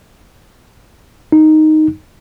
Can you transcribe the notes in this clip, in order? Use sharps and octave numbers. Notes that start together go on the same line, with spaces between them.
D#4